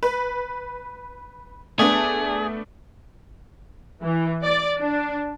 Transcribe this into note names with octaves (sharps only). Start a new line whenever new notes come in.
B4
A3 B3 D4 G#4
E3
D5
D4